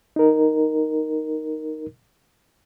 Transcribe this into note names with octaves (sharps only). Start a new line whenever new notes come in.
D#4 A#4